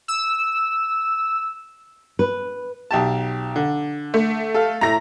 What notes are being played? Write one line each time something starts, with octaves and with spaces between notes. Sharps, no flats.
E6
B4
B1 G4 A5
D3
A3
A4 F5
A2 A3 A#5 A#6